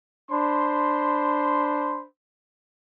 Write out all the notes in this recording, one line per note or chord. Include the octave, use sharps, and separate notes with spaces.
D4 C5 B5 C6